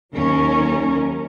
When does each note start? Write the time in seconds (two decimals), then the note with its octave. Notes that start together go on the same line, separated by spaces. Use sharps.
0.13 D#2 F#3 C#4 A#4